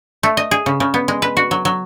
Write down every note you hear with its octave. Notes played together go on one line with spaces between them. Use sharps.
A3
D#5
G#4
C#3
C#3
B3
G#3
B4
F#4
F#3
F#3